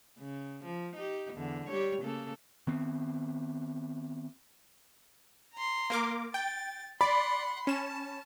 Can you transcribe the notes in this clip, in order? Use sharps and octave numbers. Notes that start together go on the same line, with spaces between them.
C#3
F3
D#4 G4
E2 D3
G3 G4 C#5
C#3 A#3 A4
D#3 B3 C4
A#5 C6
A#3 A#4 D6
G5 A6
D5 F#5 B5 C6
C#4 A5 E7